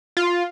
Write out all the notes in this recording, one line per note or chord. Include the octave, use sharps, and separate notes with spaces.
F4